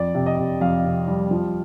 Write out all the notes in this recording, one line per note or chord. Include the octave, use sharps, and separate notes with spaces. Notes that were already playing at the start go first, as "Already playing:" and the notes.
Already playing: F2 D5
C3
D#5
C3
F2 F5
C3
G3
F3